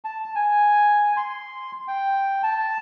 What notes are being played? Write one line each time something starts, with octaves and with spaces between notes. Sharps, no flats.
A5
G#5
C6
G5
A5